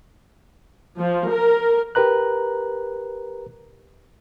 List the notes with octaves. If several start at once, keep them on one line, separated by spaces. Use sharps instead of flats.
F3
A#4
G4 A#4 B4 A#5 F#6